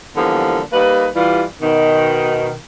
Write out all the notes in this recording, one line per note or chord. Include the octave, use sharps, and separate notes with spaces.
D3 E3 F3 G3 A#3 B3
G3 A#3 D#4 B4
E3 G3 F4
B2 D#3